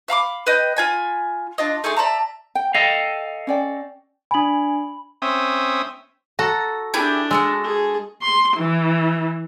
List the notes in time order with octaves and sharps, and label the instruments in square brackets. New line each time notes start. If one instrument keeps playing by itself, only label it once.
[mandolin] E5 F5 B5 D6
B4 D#5 G5 G6
F4 G#5 B5
D4 F4 D#5
A3 D#4 G#4 C6
D5 E5 A5 A#5
[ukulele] G5
[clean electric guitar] A4 D#5 F5 [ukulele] G5
[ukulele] C#4 D5 G5
[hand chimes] D4 G#5 [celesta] B5 F#7
[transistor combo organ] C4 C#4 E5 D#6
[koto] F#4 A4 [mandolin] A#5
[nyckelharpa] D4 [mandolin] E4 G4 G#4
[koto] G#3 [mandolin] F#4 A4 E6
[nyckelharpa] G#4
[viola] C6
E3